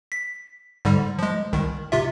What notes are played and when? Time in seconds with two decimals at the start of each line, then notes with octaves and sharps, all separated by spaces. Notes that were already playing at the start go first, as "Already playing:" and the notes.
0.12 B6
0.85 G#2 D3 G3
1.19 F3 G#3
1.53 C2 D#3
1.92 C3 F4 E5